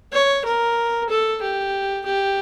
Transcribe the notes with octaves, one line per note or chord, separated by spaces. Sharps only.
C#5
A#4
A4
G4
G4